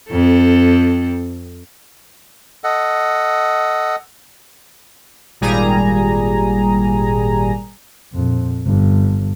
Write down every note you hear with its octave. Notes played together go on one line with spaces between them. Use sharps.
F2 C4 A4
A4 D#5 F#5
G#1 A#2 G3 G#4 G#5 A#5
A#1 F2
G1